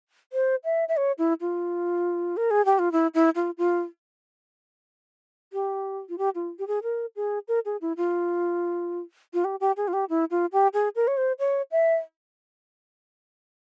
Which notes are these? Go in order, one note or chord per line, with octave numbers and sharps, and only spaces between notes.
C5
E5
E5
C#5
E4
F4
A#4
G#4
G4
F4
E4
E4
F4
F4
G4
F4
G4
F4
G4
G#4
A#4
G#4
A#4
G#4
E4
F4
F4
G4
G4
G#4
F4
G4
E4
F4
G4
G#4
A#4
C#5
C5
C#5
E5